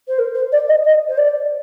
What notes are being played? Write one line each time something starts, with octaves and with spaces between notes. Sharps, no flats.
C5
A#4
C5
D5
D#5
D#5
C5
D5